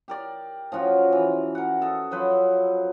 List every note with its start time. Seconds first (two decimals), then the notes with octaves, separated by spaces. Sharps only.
0.08 G4 A#4 D5
0.72 F3 C#4 F4 F#4
1.12 E3
1.55 A#4 F#5
1.82 A4 D#5
2.11 F3 F#3 B4 C5